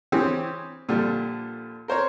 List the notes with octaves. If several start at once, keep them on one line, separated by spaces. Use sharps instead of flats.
E3 C4 C#4 G4 G#4
A#2 D3 F3 G3
A#4 C5 C#5 A#5